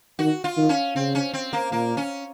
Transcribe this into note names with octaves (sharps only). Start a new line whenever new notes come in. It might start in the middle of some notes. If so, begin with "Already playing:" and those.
D#3 F#4
F4
D#3
C#4
C#3 C4
C#4
C4
A#3
A#2 A#3
C#4